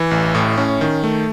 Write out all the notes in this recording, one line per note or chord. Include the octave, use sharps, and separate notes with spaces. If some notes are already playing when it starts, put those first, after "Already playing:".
Already playing: E3
A1
A2
C#4
D#3
A3